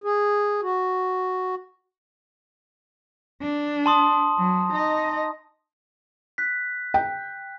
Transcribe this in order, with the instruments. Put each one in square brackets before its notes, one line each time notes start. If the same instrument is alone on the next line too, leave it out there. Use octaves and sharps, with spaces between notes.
[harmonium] G#4
F#4
[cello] D4
[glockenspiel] A5 C6 D#6
[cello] F#3
D#4 D#5
[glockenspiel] F#6 B6
[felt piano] G5